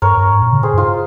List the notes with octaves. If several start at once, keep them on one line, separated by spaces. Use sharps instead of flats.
G2 A#4 C#5
G2
G#2
A#2
C#3
G#4 C5
G2 F4 G#4